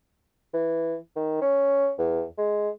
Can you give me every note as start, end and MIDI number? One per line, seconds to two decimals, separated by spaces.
0.54 0.96 52
1.16 1.39 51
1.42 1.91 61
1.99 2.24 40
2.38 2.69 56